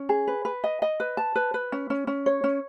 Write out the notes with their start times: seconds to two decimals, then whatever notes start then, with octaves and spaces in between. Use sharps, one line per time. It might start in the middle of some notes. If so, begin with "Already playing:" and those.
Already playing: C#4
0.09 G#4
0.27 B4
0.45 B4
0.64 D#5
0.82 D#5
1.00 B4
1.17 A5
1.35 B4
1.54 B4
1.72 C#4
1.90 C#4
2.07 C#4
2.26 C#5
2.44 C#4